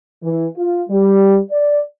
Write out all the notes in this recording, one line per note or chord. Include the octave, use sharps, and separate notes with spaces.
E3
F4
G3
D5